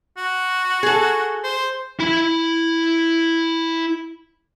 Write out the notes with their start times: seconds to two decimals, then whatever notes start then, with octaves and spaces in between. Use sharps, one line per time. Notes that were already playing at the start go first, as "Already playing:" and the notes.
0.17 F#4
0.83 G#4 A4
1.44 C5
2.00 E4 B5